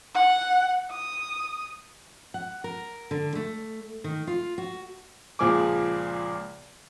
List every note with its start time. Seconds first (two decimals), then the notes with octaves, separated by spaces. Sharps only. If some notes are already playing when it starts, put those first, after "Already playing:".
0.15 F#5
0.92 D#6
2.34 F#5
2.64 A#4
3.11 D3
3.35 A3
4.04 D#3
4.27 F4
4.58 F#4
5.39 C#2 A#2 F3 G#4 D6